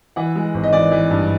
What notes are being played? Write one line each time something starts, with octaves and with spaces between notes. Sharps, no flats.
E3 F#5
G#3
G#1
D#5
E3 D5
E3
G2